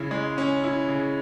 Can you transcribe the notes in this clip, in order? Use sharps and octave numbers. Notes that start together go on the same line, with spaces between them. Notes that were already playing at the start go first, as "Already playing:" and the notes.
Already playing: C#3 C#4 E4
G#3
C#4
E4
C#3